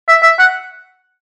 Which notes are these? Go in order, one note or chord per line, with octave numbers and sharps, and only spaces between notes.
E5
E5
F#5